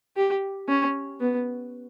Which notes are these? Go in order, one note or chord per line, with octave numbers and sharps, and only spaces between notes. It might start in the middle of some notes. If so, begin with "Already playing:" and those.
G4
C#4
B3